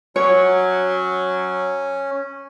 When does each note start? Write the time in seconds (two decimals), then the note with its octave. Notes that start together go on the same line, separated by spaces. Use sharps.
0.16 F#3 C#4 C#5